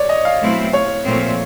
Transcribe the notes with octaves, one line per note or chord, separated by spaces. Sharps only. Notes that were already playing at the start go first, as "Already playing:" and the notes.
Already playing: C#5 D5
D#5
F5
B2 F#3 A3 C4 E4
C#5
A#2 F3 A3 C4